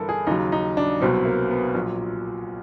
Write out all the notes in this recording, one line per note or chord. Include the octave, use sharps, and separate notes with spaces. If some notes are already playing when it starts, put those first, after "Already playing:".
Already playing: G1 G2 E3 A4 A#4
G#4
D#2 C#3 F#3 D#4
D#4
D4
C2 B2 F#3 C4
A#3
B3
A#1 A#2 F#3